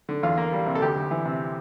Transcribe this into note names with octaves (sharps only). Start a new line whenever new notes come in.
D3
E2 F4
A#3
G3
C3
A4
D2 G4
D2
E3
C3